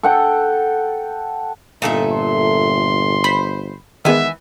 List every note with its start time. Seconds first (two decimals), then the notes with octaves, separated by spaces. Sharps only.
0.03 A4 F#5 G5
1.82 G1 A#2 D#4 A4 E5
2.12 C6
3.24 C5 B5
4.05 D#3 E3 G#3 B3 E5 G#5